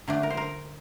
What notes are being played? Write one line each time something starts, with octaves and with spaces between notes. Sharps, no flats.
D3 A3 D4
A#4
C5
A#4